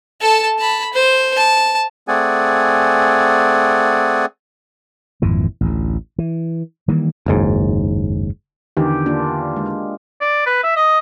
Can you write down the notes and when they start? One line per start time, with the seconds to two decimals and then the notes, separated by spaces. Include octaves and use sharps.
0.21 A4 A5
0.59 A5 B5
0.93 C5
1.36 A5
2.08 A3 C4 G#4 D5 F#5 G#5
5.22 G#1 F2 A#2 E3
5.61 A1 D2
6.18 E3
6.88 D#3 E3 G3 A#3
7.26 F#1 D#2 G#2
8.77 E2 D3 D#3 G4
9.06 A#3 D4 F4
9.56 G#3
10.21 D5
10.46 B4
10.63 E5
10.76 D#5